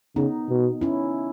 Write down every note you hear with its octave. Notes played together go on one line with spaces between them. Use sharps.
C#3 B3 D#4
B2
C#4 E4